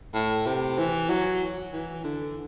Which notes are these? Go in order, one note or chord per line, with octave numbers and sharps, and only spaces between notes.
A2
C3
E3
F#3
E3
D3